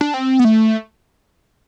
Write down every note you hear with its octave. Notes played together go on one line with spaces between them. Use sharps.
D4
C4
B3
A3